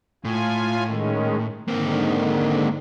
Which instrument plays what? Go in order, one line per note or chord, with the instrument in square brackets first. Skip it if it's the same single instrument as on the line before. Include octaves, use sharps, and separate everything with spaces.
[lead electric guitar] A2 [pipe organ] F4 G#5
[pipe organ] D#3 G#3 C#4
[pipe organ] G#2 D3 D#3 [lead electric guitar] A#3 C4